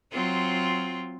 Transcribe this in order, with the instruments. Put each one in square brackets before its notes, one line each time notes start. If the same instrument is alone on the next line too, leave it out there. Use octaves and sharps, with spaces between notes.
[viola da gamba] F#3 C4 F4